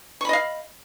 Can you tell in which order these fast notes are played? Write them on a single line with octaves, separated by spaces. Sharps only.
C#6 B5 D#5 F5